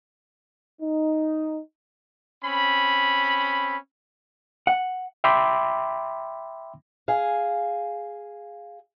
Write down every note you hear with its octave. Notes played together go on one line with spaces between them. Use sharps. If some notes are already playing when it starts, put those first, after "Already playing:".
D#4
C4 C#4 B5
F#5
E5 G5 B5 C6 D6 E6
G#4 F5